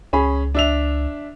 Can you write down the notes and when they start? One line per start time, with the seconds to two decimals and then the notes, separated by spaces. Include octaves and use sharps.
0.13 C#2 C#4 G#4 B5
0.55 D4 E5 F7